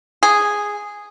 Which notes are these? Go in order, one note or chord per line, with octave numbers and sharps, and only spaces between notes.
G#4